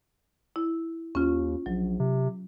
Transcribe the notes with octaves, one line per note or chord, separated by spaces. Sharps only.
E4
D#2 C#4 F4
A#1 F#3
C3